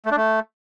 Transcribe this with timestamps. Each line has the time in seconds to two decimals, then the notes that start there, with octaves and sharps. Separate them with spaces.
0.05 A3
0.11 D4
0.17 A3